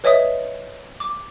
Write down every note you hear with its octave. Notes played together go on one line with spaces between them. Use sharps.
B4 C#5 D#5 E5 D#6
D6